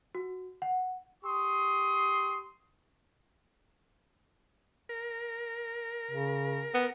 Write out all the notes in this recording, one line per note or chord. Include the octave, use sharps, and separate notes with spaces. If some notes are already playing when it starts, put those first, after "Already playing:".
F#4
F#5
G4 C6 C#6 D#6
A#4
C#3
B3